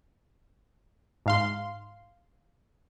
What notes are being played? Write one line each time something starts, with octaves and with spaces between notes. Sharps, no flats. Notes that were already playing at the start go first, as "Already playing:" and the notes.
G#2 F5 C6